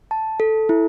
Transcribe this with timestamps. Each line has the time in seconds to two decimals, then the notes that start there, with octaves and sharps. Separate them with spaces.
0.11 A5
0.40 A4
0.69 E4